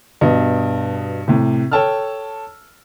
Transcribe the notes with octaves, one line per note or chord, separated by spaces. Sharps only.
G2 B2 D#5
A2 C3
A4 C#5 G5 A5 E6 F6